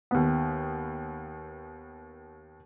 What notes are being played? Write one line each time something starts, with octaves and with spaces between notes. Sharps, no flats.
D#2 B3